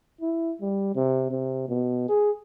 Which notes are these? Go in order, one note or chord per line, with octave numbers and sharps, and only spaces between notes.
E4
G3
C3
C3
B2
G#4